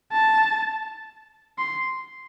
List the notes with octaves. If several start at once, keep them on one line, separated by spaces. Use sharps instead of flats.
A5
C6